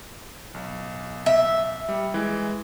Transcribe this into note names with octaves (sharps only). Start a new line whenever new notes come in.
B1
E5
G3
E3 G#3